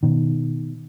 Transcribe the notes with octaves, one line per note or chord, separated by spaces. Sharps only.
B2 D#3